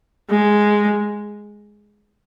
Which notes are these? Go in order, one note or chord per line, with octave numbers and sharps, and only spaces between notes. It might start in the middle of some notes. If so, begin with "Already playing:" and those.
G#3